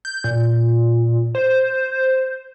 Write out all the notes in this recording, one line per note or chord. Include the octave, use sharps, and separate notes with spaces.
G6
A#2
C5